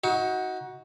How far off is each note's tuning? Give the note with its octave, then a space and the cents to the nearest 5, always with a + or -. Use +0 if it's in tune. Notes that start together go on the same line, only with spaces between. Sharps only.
D#4 +30 F#4 +0